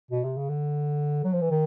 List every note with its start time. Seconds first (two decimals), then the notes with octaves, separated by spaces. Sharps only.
0.11 B2
0.24 C3
0.37 C#3
0.49 D3
1.24 F#3
1.33 F3
1.41 E3
1.50 D#3